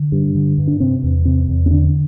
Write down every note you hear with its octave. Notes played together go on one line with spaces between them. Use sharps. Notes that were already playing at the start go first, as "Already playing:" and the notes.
Already playing: D3
G2
D3
G2
D4
C3 C4
E2
C3 C4
E2
C4
D3 D4